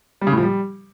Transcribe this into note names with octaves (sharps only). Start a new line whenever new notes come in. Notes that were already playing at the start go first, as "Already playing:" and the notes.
G3
C#3
A2
F3
G3